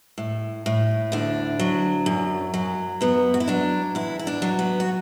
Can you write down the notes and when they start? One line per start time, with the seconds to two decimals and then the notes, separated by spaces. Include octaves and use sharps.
0.18 A2
0.66 A2
1.12 D2 D4
1.59 F#3
2.06 F#2
2.54 F#3
3.01 F#2 B3
3.34 F#4
3.40 E4
3.47 F#3 D4
3.95 E2 E4
4.19 E4
4.27 D4
4.42 F#3
4.59 B3
4.80 F#4